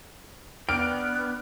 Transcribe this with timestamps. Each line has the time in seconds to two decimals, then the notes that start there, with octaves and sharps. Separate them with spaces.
0.69 B3 D4 D5 G5 F6 D7